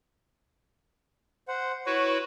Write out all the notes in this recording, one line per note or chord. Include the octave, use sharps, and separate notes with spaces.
C5 F#5
E4 F#4 B4 C#5